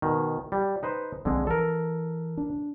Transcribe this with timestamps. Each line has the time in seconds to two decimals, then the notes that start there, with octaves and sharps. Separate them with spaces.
0.02 B2 D#3
0.52 G3
0.83 D#4 B4 C5
1.25 B1 D3 F3 G#3 C4
1.47 E3 A4 A#4
2.37 D4